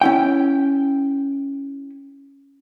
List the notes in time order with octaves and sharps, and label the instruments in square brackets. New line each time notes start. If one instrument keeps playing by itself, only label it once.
[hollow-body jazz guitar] C#4 E4 G5